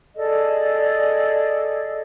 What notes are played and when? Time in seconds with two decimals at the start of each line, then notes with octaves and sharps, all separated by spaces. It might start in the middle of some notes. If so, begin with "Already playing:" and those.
0.16 G#4 A4 D5 D#5